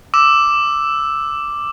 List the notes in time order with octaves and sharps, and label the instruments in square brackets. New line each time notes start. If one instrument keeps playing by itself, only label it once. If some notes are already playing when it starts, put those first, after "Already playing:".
[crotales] D6 E6 E7